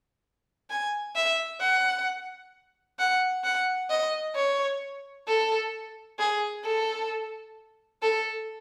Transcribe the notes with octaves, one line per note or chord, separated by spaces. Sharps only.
G#5
E5
F#5
F#5
F#5
D#5
C#5
A4
G#4
A4
A4